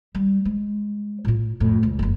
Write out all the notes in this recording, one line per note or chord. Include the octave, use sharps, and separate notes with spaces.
G3
G#3
A2 F4
F2 A2
C#2
F#1 F2